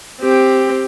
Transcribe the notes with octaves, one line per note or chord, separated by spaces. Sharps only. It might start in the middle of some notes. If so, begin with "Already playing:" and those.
C4 G4